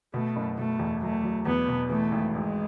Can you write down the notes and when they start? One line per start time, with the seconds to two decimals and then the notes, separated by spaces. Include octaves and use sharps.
0.14 B2 A3
0.36 F#1
0.58 B2 A3
0.79 E2
1.02 F#3 A3
1.23 F#3
1.45 E2 B3
1.68 B2
1.90 E3 A3
2.12 G#1
2.34 G#1 G#3